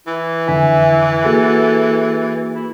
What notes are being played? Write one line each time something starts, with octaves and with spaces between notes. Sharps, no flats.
E3 E4
F2 D3 E5 G#5
A#3 F#4 G#4 A4
E4